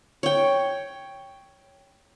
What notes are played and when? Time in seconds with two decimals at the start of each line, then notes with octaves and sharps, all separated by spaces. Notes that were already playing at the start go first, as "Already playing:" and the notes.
0.23 C#5 G5